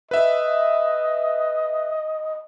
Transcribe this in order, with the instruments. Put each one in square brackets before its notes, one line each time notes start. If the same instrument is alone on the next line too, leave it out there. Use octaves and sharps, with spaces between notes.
[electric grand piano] B4 E5 [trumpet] D#5